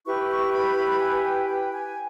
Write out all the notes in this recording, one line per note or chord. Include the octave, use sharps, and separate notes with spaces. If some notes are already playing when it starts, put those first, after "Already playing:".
E4 G4 B4 C#6
C#6
B5
G#5
G5
G5
G#5